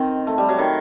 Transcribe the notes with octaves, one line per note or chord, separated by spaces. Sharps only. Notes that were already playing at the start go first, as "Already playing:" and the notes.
Already playing: D#3 C4
A3
G3
F#3
D#3